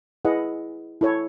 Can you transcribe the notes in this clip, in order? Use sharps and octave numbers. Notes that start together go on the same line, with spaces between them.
E4 G#4 B4 D#5 F#5
E4 A4 C#5